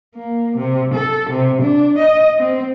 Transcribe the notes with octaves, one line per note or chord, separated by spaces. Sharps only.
A#3
C3
A4
C3
D4
D#5
C4